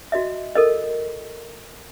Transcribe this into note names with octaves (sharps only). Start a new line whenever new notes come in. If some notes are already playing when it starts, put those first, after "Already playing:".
F#4 D#5 E5
A4 A#4 D#5